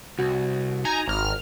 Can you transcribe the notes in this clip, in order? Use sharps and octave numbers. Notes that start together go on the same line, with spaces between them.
C2 F#4
D#4 G#5 A#5
G#1 A#5 F6